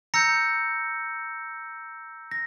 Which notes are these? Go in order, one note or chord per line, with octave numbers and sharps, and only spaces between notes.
A#5 E6 G6 A#6 C#7
A#6